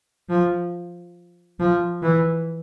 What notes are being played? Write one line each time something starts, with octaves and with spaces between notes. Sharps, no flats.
F3
F3
E3